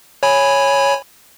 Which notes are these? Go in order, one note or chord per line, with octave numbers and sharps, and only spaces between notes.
C#5 G#5 B5